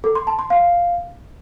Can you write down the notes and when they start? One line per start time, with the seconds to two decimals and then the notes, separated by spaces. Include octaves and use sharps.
0.04 A4
0.15 C6
0.27 A5
0.39 C6
0.50 F5